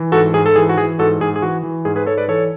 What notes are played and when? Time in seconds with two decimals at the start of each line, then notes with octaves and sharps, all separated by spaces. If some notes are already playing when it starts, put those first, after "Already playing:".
Already playing: E3
0.12 G#2 F#4 A4
0.34 G#2 G#4
0.46 A4
0.56 E3 G#4
0.69 F#4
0.77 E3 G#4
0.99 G#2 F#4 A4
1.20 G#2 G#4
1.36 G#4
1.42 E3 F#4
1.63 E3
1.85 G#2 G#4
1.96 G#4 B4
2.06 G#2 A4 C#5
2.18 B4 D5
2.28 E3 A4 C#5